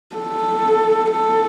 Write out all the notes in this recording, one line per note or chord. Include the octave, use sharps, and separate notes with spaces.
A4
A4